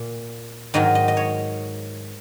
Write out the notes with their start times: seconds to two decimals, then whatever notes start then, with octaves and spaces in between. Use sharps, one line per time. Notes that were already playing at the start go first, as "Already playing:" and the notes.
Already playing: A#2
0.74 G#2 D#3 F#3 D#5
0.95 D#5
1.08 D#5
1.17 C#5